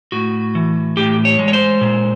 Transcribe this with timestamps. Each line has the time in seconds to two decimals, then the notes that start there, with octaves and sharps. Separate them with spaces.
0.12 A2 F#4
0.55 E3
0.97 A2 G4
1.25 C#5
1.39 G#3
1.48 C#5
1.53 C5
1.81 A#2